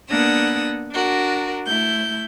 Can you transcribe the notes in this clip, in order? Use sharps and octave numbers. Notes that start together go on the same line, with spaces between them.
A#3 B3 D4 F#5 D#6 E6
D4 F#4 A#4
A3 E4 G6